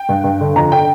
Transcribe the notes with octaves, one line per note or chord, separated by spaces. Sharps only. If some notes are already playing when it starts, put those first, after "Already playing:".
Already playing: G5
G2
G2
D3
F2 A#5
D3 G5